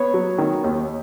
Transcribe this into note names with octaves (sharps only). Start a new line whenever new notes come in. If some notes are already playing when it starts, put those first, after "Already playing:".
Already playing: B3 C#5
F#3
D#3
D#2